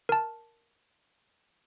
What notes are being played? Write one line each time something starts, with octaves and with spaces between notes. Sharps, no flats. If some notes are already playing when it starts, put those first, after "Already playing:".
A#4 A5